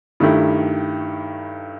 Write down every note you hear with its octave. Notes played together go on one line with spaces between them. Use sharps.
G2 D#3 A3 E4 G4